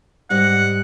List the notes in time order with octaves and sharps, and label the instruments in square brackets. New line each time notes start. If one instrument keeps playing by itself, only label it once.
[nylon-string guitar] G#2 G3 G#3 [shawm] F#5